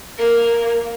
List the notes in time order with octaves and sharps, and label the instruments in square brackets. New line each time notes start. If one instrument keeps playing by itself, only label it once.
[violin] A#3 A#4